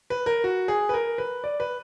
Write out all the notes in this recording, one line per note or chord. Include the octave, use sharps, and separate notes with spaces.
B4
A#4
F#4
G#4
B4
A#4
B4
D5
B4